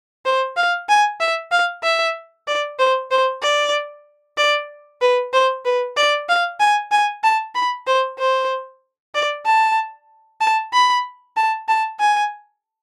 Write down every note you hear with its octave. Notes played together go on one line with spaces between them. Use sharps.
C5
F5
G#5
E5
F5
E5
D5
C5
C5
D5
D5
B4
C5
B4
D5
F5
G#5
G#5
A5
B5
C5
C5
D5
A5
A5
B5
A5
A5
G#5